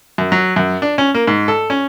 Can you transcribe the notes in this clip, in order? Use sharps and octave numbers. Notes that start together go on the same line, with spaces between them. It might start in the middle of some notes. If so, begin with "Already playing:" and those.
F#2
F#3
F#2
D4
C#4
A#3
G#2
A4
C#4